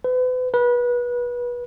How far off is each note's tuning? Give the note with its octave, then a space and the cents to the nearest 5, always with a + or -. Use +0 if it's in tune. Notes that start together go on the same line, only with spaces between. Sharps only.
B4 +40
B4 -25